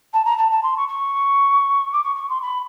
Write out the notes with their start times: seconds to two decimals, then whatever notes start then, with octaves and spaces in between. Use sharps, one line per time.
0.13 A5
0.25 A#5
0.37 A5
0.51 A5
0.63 C6
0.76 C#6
0.88 C#6
1.92 D6
2.03 C#6
2.15 C#6
2.29 C6
2.42 B5